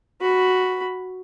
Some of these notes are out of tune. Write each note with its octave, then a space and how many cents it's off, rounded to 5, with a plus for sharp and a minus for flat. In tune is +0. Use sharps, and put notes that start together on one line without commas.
F#4 +0 B5 +0